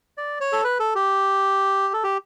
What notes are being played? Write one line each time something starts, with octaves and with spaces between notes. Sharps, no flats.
D5
C#5
A4
B4
A4
G4
A4
G4